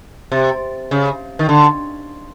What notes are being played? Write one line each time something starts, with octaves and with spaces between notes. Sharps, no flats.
C3
C#3
D#3
D3